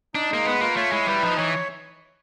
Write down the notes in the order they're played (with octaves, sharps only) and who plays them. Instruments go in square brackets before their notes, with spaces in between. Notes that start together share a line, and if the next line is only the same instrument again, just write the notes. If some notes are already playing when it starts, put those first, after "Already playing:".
[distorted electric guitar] D4 [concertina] D#4
[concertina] G#3 [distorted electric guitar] A#3
[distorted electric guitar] B3 [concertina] B4
[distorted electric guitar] A#3 [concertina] F4
[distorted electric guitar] A3 [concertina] C#5
[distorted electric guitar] G#3 [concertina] E4
[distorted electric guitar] G3 [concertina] B4
[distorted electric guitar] F3 [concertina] D#4
[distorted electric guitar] E3 [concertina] C#5